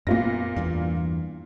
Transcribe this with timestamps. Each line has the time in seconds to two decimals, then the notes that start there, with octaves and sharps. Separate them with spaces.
0.07 F#2 A#2 B3 F4 A#6
0.56 E2 G2 E3